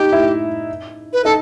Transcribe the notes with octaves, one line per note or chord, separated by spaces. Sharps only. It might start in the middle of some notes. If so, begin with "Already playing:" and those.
Already playing: D#4 G4 D#5
E4 E5
B4
D#4 A4 D#5